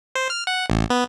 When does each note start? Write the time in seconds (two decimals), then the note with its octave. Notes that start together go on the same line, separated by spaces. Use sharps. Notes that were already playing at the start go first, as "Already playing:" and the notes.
0.15 C5
0.30 F6
0.47 F#5
0.70 A1
0.90 B3